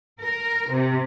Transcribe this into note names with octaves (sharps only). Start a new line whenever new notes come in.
A#4
C3